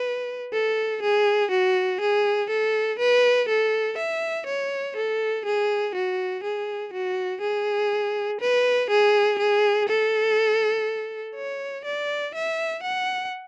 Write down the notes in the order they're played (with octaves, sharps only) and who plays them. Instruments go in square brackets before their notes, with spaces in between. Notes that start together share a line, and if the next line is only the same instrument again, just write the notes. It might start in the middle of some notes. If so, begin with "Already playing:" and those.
Already playing: [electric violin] B4
A4
G#4
F#4
G#4
A4
B4
A4
E5
C#5
A4
G#4
F#4
G#4
F#4
G#4
B4
G#4
G#4
A4
C#5
D5
E5
F#5